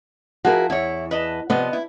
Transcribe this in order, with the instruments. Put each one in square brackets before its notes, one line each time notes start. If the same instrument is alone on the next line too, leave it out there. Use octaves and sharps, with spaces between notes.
[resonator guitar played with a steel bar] F3 E4 [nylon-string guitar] F#4 G#4 A#4
[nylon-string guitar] E2 [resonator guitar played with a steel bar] E4 C#5
[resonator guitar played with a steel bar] B4 D#5 A5
[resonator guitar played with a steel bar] C3 F3 [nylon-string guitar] B3 D5 D#5
[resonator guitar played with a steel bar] E4